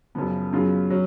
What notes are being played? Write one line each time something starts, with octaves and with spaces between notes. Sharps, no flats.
F#1 F#2 C#3 F3 B3
F#2 C#3 F#3 B3 F4
F#3 C#4